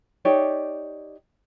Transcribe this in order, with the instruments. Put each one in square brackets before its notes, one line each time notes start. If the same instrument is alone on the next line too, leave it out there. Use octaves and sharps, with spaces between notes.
[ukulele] D#4 G4 C#5 D5